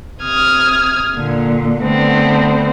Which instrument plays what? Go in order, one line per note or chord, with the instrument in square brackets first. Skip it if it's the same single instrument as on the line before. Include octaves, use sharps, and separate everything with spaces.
[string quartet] C3 D#6 F6 G#6
A#2 D3
D3 A3 B3 C4